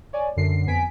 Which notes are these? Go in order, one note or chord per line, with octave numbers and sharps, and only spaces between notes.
C#5 D5 G#5
F#2 D3 C7
F2 B3 G#5 B6 D7